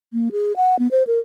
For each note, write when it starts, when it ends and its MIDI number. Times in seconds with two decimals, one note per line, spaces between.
0.13 0.29 58
0.32 0.53 68
0.57 0.78 78
0.79 0.88 59
0.91 1.03 72
1.07 1.19 70